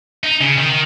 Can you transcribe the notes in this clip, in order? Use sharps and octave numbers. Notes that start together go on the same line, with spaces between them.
D#4
C#3
D#3
D#3